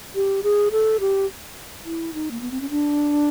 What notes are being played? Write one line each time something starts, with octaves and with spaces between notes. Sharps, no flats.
G4
G#4
A4
G4
E4
D#4
A#3
B3
C4
C#4
D4